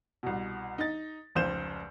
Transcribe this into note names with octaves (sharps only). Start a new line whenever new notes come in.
C2 B2
D#4 A6
F1 C#2 C5 G6 E7